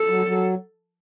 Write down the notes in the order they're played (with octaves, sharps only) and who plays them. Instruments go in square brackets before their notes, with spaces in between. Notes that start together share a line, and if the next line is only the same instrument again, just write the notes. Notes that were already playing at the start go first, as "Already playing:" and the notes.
Already playing: [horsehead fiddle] A4
[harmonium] F#3
F#3